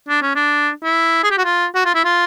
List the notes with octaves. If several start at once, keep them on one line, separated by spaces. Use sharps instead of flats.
D4
C#4
D4
E4
G#4
G4
F#4
F4
F#4
F4
E4
F4